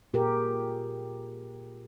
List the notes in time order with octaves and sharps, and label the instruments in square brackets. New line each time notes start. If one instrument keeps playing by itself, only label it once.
[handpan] A#2 G4 G#4 A#4